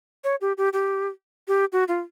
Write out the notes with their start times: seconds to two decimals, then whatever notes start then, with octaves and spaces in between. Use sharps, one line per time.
0.24 C#5
0.41 G4
0.58 G4
0.73 G4
1.48 G4
1.73 F#4
1.88 F4